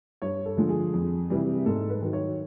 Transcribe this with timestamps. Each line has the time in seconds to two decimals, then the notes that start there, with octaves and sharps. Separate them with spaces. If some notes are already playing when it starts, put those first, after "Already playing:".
0.22 G2 C#5
0.46 A4
0.57 D3 F3 G#3
0.69 G#4
0.94 F2
1.30 C3 E3 G3
1.66 G#2 A4
1.90 B4
2.02 D#3 F#3
2.13 C#5